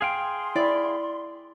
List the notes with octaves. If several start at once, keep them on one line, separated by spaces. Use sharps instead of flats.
G#4 F5 G5 C6
E4 D5